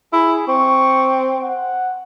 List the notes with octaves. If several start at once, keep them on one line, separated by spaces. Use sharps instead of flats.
E4 G#4
C4 C#6
F#5